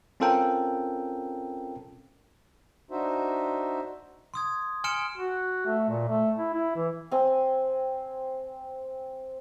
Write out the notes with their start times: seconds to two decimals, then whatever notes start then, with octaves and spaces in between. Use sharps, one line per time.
0.20 C4 C#4 F4 A4 A#4 G5
2.91 D4 D#4 F#4 C5 E5
4.34 C6 D#6 G#6
4.84 G#5 C6 F6 C#7 D7 E7
5.18 F#4
5.66 A3
5.89 A#2
6.08 A3
6.37 E4
6.53 E4
6.76 E3
7.12 C4 G#5